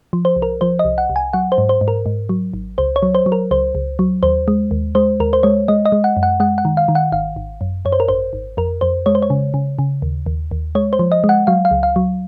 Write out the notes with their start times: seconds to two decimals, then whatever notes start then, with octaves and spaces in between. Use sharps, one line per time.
0.13 F3
0.25 C5
0.36 C2
0.42 A#4
0.61 F3 C5
0.79 D#5
0.85 C2
0.98 F#5
1.10 C2
1.16 G#5
1.33 F#3 F#5
1.52 C5
1.58 G#2
1.69 C5
1.81 G#2
1.88 A#4
2.06 G#2
2.29 F#3
2.54 G#1
2.78 C#2 C5
2.96 C#5
3.03 F#3
3.15 C5
3.26 F#3
3.32 A#4
3.51 C#2 C5
3.75 C#2
3.99 F#3
4.23 D#2 C5
4.48 G#3
4.71 D#2
4.95 G#3 C5
5.20 D#2 A#4
5.33 C5
5.43 G#3 C#5
5.68 G#3 D#5
5.85 D#5
5.92 G#3
6.04 F#5
6.17 F#2
6.23 F#5
6.40 G#3 F#5
6.58 F#5
6.65 D#3
6.77 F5
6.88 D#3
6.95 F#5
7.12 G#1 F5
7.36 G#1
7.61 F#2
7.85 F#2 C#5
7.92 C5
8.00 A#4
8.08 G#1 C5
8.33 G#1
8.57 F2 A#4
8.81 F2 C5
9.06 G#3 C#5
9.15 C5
9.22 C#5
9.30 C#3
9.54 C#3
9.79 C#3
10.02 D#2
10.26 D#2
10.51 D#2
10.75 G#3 C#5
10.93 C5
10.99 F3
11.12 D#5
11.24 G#3
11.29 F#5
11.47 F#3 F5
11.65 F5
11.71 C#2
11.83 F5
11.96 F#3